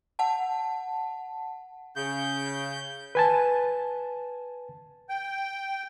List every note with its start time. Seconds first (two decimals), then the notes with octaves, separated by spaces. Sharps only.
0.19 F#5 A5
1.96 C#3 G6
3.15 B4 G#5 A5
5.09 G5